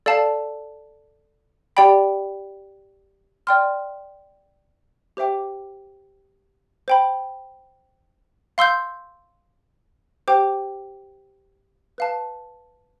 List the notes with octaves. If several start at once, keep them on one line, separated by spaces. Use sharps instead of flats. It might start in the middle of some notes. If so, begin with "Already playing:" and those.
A4 D5 F5 A5
G4 D5 G5 B5
D5 G5 C6 F6
G4 C5 E5 G5 D6
C5 G5 B5
F5 C6 E6 G6
G4 C5 G5 D6
B4 F5 A5